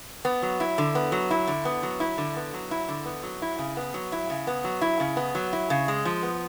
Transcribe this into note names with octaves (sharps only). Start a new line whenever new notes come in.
B3
F#3
E4
D3
B3
F#3
E4
D3
B3
F#3
E4
D3
B3
F#3
E4
D3
B3
F#3
E4
C#3
B3
F#3
E4
C#3
B3
F#3
E4
C#3
B3
F#3
E4
C#3
G#3
F3
B3